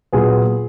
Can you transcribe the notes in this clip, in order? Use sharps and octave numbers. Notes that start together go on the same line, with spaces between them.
A#2 F#3 B3 G#4